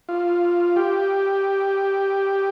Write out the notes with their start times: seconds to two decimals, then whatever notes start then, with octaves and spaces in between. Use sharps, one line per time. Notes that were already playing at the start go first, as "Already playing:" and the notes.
0.09 F4
0.76 G4